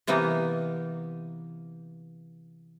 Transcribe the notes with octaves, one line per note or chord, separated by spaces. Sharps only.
C3 E3 A#3 B3 D#4